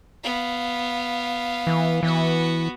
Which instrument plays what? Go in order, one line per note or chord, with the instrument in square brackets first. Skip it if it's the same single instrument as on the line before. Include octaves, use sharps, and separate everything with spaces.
[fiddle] B3 F5
[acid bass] E3
[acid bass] E3 [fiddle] B3 F#4